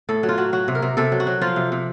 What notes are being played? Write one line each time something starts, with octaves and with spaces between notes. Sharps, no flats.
A2 A4
F#3
F4
F#3 F#4
F#3 F#4
C3
A#4
C3
C3 A4
F#3
F#4
F#3
F3 F4
C3
C3